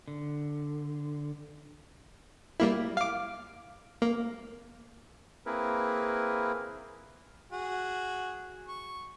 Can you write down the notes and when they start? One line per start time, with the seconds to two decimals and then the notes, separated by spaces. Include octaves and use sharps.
0.08 D3
2.60 G3 A#3 E4
2.97 F5 D6
4.02 A#3
5.46 A#3 C4 E4 G#4 A#4 B4
7.52 F#4 G#4
8.68 C#6